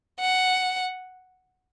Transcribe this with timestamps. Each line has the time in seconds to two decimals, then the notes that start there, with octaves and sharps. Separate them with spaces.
0.20 F#5